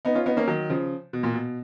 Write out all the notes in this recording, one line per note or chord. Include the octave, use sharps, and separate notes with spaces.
B3 D#4
C#4 F4
B3 D#4
A#3 C#4
D#3 F#3
C#3 F3
B2
A#2
B2